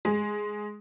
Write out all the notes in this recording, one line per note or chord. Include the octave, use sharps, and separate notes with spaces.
G#3 G#4